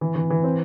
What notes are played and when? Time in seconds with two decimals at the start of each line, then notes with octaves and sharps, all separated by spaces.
0.01 E3
0.15 E3
0.30 E3
0.44 C4